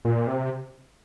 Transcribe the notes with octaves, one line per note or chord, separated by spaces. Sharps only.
A#2
C3